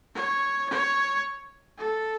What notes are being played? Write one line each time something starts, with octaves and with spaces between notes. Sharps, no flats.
C#5
C#5
A4